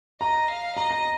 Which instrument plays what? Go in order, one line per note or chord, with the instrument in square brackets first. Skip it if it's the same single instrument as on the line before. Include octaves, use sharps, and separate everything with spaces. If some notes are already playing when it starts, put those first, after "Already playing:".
[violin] D#5 [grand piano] A#5
[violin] F5
[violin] D#5 [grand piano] A#5
[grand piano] A#5